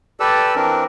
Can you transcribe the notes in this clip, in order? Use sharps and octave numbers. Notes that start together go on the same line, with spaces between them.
G4 A4 B4 D5 E6
E3 C4 D4 A#4